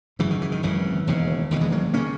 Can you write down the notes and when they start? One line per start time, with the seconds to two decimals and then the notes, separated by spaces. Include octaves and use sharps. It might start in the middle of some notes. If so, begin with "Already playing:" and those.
0.19 G#1 F#2 C#3 E3
0.30 D#3
0.42 E3
0.52 D#3
0.63 G#1 F#2 C#3 E3
1.07 E1 D#2 C#3
1.51 E1 D#2 C#3
1.61 E3 G#3
1.72 F#3 A#3
1.94 C#3 A#3 C#4